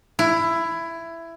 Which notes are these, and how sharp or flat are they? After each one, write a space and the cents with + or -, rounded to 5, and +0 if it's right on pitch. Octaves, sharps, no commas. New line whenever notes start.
E4 +15